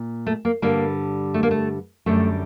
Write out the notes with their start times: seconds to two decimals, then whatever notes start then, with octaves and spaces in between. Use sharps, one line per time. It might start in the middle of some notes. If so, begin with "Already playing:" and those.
Already playing: A#2
0.26 A3
0.45 A#3
0.62 G2 D3 G3 A#3
1.34 A3
1.43 A#3
1.51 A3
2.06 F#2 D3 G3 A3